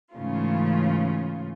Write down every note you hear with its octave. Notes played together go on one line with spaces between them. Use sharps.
G#2 C#3 E3 A3 C#4 F4